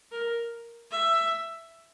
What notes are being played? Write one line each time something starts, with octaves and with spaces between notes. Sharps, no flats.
A#4
E5